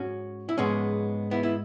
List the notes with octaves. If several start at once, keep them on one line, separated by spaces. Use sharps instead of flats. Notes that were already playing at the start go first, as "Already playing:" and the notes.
Already playing: G#2 C#4 F#4
E4
G#2 G#3 B3 C#4
B3 E4
E4